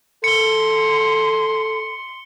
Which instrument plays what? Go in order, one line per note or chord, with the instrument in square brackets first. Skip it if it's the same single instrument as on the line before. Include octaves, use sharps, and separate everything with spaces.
[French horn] A4 [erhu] C6 [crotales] C#7 G7